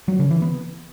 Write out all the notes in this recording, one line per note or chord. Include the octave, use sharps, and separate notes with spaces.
F#3
C#3
E3
B3